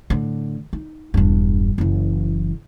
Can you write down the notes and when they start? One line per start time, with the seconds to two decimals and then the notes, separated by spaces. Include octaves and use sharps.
0.10 A2 D3
0.73 D#4
1.14 E1 G2
1.78 F#1 E3